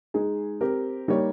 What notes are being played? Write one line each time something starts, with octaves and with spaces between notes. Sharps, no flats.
G#3 D#4 G#4
C4 G4 A#4
G3 A#3 D#4 G4 C#5